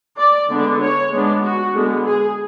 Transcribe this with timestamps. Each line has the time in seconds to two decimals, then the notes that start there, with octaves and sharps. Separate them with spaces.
0.18 D5
0.49 D3 G#3 B3 D4
0.80 C#5
1.12 G#3 B3 D4
1.42 F#4
1.73 D3 G#3 B3
2.05 G#4